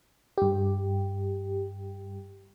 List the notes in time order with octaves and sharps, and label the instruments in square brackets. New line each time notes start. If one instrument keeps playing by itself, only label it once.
[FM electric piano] G2 G4